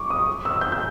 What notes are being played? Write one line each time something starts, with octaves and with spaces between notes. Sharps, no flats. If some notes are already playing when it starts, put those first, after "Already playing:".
Already playing: C#6 D6
D#6
E6
G6
G6